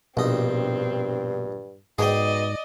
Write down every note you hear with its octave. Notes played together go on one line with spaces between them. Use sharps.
A#1 G2 B2 C4 D#4
G#2 B2 G#4 D5 D#5 G5